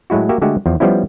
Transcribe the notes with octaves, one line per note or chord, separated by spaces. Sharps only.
A2 F#3 G#3 E4 F#4
A#3 F#4 G4 E5
D3 G#3 A3 F#4 G4
E2 F3
F3 G3 B3 C#4 E4